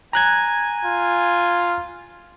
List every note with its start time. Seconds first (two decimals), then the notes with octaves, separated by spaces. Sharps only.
0.13 G#5 A#5 F#6 G#6
0.85 F4